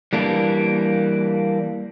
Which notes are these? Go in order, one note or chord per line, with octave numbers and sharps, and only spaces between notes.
E3 G3 A#3 D4